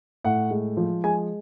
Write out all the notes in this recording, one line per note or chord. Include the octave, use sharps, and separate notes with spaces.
A2 F#5
G#3
F3
G#3 G#5